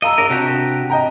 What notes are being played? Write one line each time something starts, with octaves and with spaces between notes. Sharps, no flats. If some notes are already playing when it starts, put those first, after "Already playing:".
D#5 F5 A#5 E6
D4 A#4
C3 F#4 G4
D#5 G5 A#5